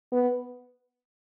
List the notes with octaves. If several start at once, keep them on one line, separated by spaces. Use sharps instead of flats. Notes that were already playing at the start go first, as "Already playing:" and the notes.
B3